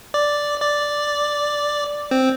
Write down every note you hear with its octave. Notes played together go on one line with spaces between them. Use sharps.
D5
D5
C4